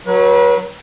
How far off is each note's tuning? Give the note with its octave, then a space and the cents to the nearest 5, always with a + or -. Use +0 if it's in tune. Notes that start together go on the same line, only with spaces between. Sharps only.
F#3 +0 B4 -40